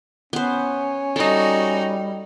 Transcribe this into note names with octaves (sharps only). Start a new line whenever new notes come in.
B3 C#4 C5
G3 D#4 F#4 A4 D#5